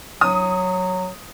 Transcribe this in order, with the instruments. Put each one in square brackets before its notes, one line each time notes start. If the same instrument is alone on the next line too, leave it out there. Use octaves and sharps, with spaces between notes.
[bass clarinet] F#3 [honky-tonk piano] D#6